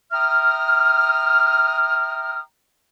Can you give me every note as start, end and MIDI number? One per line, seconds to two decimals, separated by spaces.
0.12 2.40 76
0.12 2.40 79
0.12 2.40 82
0.12 2.40 87
0.12 2.40 89